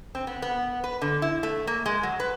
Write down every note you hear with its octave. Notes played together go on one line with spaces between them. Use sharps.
C4
B3
B3
B4
D3
E4
A3
A#3
G#3
F#3
B4